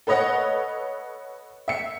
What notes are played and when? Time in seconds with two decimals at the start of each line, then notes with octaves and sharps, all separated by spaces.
0.07 A4 B4 C#5 D#5 F#5
1.68 E5 C#7